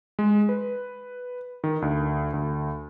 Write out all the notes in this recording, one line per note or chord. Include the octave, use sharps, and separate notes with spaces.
G#3
B4
D#3
D2
D2